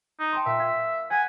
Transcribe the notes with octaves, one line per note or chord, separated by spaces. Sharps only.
D#4
G5 A5 C6
A#2 E5
F5 G#6 B6
F#5 G#5 A#6 B6